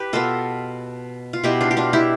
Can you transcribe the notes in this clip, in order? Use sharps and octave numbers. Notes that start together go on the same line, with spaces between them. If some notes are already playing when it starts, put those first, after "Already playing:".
Already playing: G4 B4
B2 B3 F4 A4
F4
B2 B3 E4 G4
D4 F4
G4
D4 F4
E4 G4